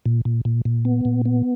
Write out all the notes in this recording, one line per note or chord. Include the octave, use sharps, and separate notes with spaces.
A#2
A#2
A#2
A#2
B3
A#2
B3